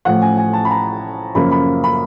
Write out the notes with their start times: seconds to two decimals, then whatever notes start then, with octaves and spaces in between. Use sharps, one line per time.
0.05 A1 A2 F3 F#5
0.21 G#5
0.37 G#5
0.53 A5
0.65 B5
0.71 A#5
1.35 F#2 C#3 F3 A#3 B5
1.51 B5
1.84 B5